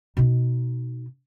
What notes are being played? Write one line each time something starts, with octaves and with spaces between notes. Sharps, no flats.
B2 D#4